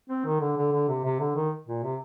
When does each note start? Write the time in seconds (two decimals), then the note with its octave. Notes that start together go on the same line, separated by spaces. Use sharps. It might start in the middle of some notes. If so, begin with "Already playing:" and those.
0.10 C4
0.25 D#3
0.41 D3
0.57 D3
0.72 D3
0.89 C3
1.04 C3
1.20 D3
1.36 D#3
1.68 A#2
1.83 C3